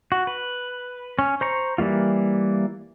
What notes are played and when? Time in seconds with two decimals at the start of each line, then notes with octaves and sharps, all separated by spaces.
0.12 F#4
0.27 B4
1.19 C#4
1.41 C5 A#5 C#6
1.78 E3 G3 A#3 F4